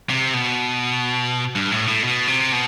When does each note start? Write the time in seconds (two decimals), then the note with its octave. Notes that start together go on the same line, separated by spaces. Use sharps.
0.10 C3
0.34 B2
1.55 G2
1.71 A2
1.88 A2
2.04 B2
2.27 C3
2.52 B2